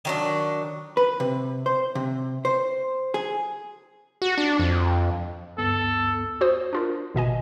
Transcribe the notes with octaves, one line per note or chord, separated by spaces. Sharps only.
D#3 F#3 D4
B4
C3
C5
C3
C5
G#4
F#4
D4
F2
D2 G2 B3 A4
F#4 C5 D#6
D4 F4 A#4
G#1 B2 D#5 G#5